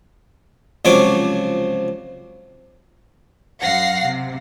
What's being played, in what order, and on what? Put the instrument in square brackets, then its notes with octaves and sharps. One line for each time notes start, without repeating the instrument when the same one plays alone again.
[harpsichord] C#2 C3 F3 F#3 C#5 D6
[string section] F#2 F5 F#5 A#6 C7
C3